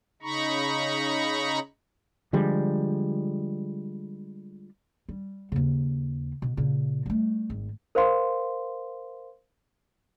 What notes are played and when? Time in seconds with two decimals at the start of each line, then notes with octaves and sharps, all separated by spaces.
0.22 C#3 D#4 A#5 B5 C#6
2.33 D3 F3 G3 G#3
5.09 G3
5.52 D#2 C#3
6.42 B2
6.57 A#2 C#3
7.06 G3 A3
7.50 G#1
7.95 A#4 C5 F5 C6